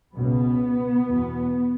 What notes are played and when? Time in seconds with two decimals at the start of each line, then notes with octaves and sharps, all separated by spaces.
0.16 C#2 B2 B3
1.05 E2 B2